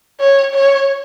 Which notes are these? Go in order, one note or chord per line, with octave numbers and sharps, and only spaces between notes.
C#5
C#5